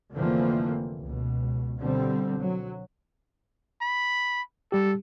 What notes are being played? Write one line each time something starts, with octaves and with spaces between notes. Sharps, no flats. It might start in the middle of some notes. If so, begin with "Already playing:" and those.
F1 D3 E3 F3 A#3 C4
C#2 B2
B2 D3 G3 C4
F#3
B5
G3 G4 A4